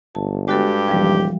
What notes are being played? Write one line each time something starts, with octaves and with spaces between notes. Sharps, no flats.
G1 A5
G2 G#3 F#4 G4 A4
D#1 E3 F3 G3